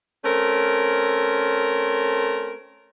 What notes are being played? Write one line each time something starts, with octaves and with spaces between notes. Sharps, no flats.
A3 C4 C#4 A#4